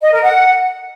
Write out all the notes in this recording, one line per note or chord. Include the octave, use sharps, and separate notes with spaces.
D#5
A#4
F#5